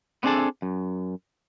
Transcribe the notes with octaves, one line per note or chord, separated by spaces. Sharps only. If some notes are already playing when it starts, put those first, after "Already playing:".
B3 C4 D4 G#4 A4 D5
F#2